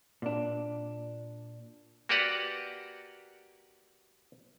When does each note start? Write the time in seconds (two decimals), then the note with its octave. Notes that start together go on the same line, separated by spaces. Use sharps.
0.22 A#2 D4
2.09 A#3 F#4 G4 B4 D5 F#5